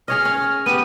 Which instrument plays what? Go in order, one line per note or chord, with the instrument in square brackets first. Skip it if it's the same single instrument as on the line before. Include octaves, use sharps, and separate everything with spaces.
[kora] G#4 C#5 D#5 [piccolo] F6
[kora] C#4
[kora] B3 G4 [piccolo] D#7